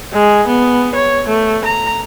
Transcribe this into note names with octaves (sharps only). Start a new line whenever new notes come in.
G#3
B3
C#5
A3
A#5